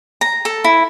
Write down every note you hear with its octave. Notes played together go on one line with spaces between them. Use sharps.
A#5
A4
E4